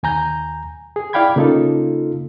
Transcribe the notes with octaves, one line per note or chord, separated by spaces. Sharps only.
D#2 G#5 A#5 G6
G#4
E4 D5 F5 G5 B5 G#6
C#3 A#3 D#4 F4 A4